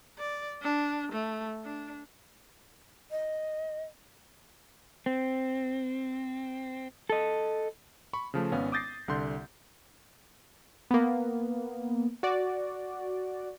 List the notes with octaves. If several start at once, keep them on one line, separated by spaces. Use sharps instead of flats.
D5
D4
A3
D4
D#5
C4
A4 D#5
B5 C#6
C#3 F3 A3
G#1 B3 C#4 F5
D6 D#6 G6 A6 A#6 C7
C2 D3 C6 G6
A#3 B3
F#4 D5